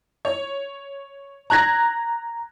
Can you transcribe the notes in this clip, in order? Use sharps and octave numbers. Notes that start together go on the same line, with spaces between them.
C#5
A#5 F#6 G#6 A#6